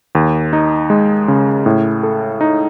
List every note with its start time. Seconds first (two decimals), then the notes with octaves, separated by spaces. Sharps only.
0.15 D#2
0.53 D#4
0.90 G#3
1.28 C#3
1.66 A2
2.03 A4
2.41 D#4